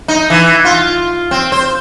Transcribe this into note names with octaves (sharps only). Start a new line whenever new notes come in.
D#4
E3
F4
C4
C5